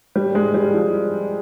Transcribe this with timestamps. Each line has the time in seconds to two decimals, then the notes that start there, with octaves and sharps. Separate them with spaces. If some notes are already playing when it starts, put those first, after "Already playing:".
0.16 G3
0.35 G#3
0.54 G3
0.74 F3